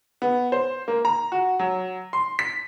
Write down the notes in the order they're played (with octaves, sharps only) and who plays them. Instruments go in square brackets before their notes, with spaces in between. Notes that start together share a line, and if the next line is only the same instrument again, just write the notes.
[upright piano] B3
C5
A#3
A#5
F#4
F#3
C6
B6